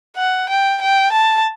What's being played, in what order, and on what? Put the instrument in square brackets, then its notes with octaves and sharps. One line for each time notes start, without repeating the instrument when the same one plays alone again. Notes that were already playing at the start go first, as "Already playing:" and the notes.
[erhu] F#5
G5
G5
A5